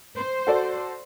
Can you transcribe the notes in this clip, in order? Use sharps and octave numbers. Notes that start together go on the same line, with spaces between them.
C5
F#4 A4 D5